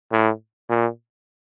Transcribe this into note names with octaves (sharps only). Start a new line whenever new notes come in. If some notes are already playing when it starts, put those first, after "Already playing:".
A2
A#2